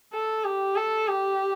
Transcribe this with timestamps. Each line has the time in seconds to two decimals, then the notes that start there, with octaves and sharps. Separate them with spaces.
0.13 A4
0.44 G4
0.76 A4
1.07 G4